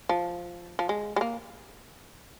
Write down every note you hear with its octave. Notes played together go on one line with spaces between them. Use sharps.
F3
F3
G#3
G#3
A#3